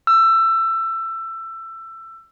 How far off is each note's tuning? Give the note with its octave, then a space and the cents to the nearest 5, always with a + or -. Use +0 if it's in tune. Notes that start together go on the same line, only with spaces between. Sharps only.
E6 +20